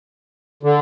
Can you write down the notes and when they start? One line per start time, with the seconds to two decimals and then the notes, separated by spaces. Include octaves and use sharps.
0.63 D3